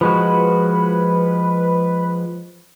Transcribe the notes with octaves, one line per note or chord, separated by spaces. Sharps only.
F3 G#3 F#4 B4